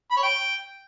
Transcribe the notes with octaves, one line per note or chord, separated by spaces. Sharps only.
B5
C#5
G5